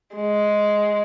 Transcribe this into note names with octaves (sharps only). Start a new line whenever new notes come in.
G#3